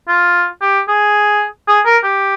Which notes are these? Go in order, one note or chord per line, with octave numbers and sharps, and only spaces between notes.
F4
G4
G#4
G#4
A#4
G4